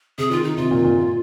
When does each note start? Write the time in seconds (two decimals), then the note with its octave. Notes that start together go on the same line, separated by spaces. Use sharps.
0.18 C3 G#4
0.31 D#3 F4
0.44 D#4
0.57 C3 F4
0.71 A#2
0.84 A#2